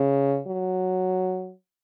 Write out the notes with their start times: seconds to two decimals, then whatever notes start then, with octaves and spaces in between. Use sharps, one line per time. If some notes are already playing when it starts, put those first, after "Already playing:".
Already playing: C#3
0.47 F#3